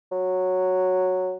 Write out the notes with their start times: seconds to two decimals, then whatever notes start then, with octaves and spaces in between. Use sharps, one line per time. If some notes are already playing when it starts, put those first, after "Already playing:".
0.12 F#3